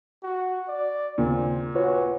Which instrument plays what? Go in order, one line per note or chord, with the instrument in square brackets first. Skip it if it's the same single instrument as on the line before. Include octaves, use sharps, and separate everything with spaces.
[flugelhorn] F#4
D5
[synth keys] D#2 C#3 [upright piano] A#2 [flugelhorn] C4
[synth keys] F4 B4 C#5 [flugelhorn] F#4